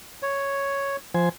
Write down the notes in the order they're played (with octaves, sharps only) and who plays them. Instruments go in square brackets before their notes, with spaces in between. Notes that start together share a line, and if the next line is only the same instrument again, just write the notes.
[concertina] C#5
[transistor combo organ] F3 C5 G#5